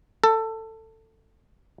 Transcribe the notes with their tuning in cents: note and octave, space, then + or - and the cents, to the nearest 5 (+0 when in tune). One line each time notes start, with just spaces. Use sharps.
A4 +15